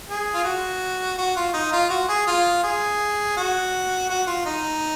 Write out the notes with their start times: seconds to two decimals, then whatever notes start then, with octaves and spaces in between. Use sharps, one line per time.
0.09 G#4
0.34 F4
0.44 F#4
1.18 F#4
1.36 F4
1.53 D#4
1.72 F4
1.90 F#4
2.09 G#4
2.27 F4
2.63 G#4
3.37 F#4
4.10 F#4
4.27 F4
4.46 D#4